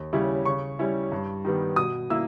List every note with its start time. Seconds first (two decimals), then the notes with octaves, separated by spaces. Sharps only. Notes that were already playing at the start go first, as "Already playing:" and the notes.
Already playing: D#2
0.13 C#3 G3 C#4 E4
0.45 C#3 C#6
0.79 G3 C#4 E4
1.12 G2
1.45 D#3 G3 B3
1.76 B2 D#6
2.10 A#3 E4 E6